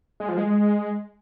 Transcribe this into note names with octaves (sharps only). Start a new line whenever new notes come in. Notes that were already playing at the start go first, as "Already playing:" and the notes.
G#3
F3
G#3